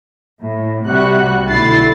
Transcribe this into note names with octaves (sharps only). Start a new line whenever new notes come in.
A2
C2 C3 G3 F#4 F#6
B1 D3 A3 E4 A6 C7